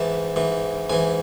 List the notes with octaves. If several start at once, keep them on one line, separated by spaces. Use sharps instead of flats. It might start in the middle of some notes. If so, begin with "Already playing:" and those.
Already playing: G#2 E3 A5
G#2 E3
G#2 E3 G#5